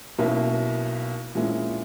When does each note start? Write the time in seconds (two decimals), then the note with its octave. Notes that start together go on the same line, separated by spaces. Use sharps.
0.18 B1 B2 A#3 C#4 E4
1.35 A#1 A#2 G#3 C#4 E4